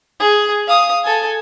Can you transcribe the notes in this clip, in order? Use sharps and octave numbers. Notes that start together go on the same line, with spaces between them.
G#4
F5 D#6
A4 G#5